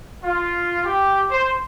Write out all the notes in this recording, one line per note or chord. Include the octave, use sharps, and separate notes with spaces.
F4
G4
C5